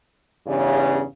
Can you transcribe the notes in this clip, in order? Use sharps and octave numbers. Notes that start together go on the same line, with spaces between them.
E2 G2 C#3